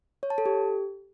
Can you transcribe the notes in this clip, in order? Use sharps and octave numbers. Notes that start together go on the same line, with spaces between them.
C#5
A5
A4
G4